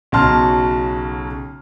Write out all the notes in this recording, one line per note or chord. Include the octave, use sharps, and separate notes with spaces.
B1 C#3 F#4 A5 C6 F6